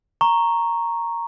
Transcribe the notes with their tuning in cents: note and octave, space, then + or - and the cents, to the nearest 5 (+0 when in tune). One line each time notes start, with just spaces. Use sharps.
A#5 +0 C#6 -5